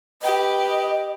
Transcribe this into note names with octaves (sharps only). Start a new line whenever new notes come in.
G4 B4 D#5